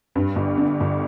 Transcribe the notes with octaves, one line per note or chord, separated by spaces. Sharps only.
G2
G1
D3
G1